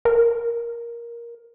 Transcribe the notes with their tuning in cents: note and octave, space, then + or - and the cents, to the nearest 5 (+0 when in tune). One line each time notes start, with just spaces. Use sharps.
A#4 +10